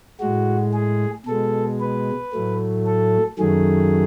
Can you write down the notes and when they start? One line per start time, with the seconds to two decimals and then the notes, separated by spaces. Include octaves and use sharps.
0.20 A2 G#3 F#4
0.73 G#4
1.26 B2 G#3 A4
1.80 B4
2.33 A2 F#3 A3
2.86 A4
3.38 F#2 D#3 F#3 A3 G#4